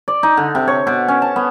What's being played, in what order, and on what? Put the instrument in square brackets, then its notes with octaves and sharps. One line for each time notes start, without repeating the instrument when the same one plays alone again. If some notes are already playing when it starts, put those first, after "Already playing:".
[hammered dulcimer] D5
D#4
D3
C3
C#5
B2
C#4
A5
B3